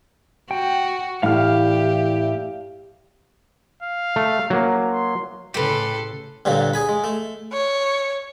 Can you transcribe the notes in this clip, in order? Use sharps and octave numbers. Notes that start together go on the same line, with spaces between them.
F#4 G5
A2 E3 E4 G4 D5 E5 F5 F6
F5
A3
F#3 A#3
C6
A2 C#3 G4 A4 B4 C6
G2 A#2 D3 F#3
G#4 G#5 B5
G#3
A3
C#5